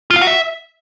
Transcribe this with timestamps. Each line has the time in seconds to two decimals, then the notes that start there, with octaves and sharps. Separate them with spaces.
0.10 F4
0.16 F5
0.21 F#4
0.27 E5